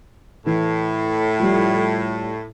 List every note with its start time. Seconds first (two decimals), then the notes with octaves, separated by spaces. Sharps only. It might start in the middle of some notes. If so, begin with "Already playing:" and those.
0.46 A2 E3
1.39 F3 G3